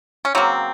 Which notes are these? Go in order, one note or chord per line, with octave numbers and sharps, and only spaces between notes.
C#4
C#3 F#3 A#3 C4